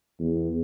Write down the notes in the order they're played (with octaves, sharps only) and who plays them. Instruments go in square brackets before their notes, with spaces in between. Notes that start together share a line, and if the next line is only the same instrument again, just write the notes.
[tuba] E2